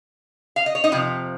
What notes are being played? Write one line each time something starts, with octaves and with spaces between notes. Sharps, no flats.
F5
D#5
C#5
D#4 D#5
F2 C3 F3